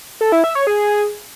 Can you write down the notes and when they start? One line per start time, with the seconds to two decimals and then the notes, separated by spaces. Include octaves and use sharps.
0.21 A4
0.32 E4
0.44 E5
0.55 C#5
0.67 G#4